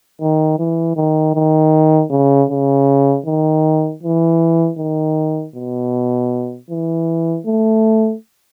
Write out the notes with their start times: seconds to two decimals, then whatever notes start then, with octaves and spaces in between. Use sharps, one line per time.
0.21 D#3
0.59 E3
0.96 D#3
1.35 D#3
2.11 C#3
2.50 C#3
3.26 D#3
4.03 E3
4.79 D#3
5.55 B2
6.70 E3
7.46 A3